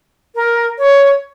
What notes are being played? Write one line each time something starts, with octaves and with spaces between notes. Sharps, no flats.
A#4
C#5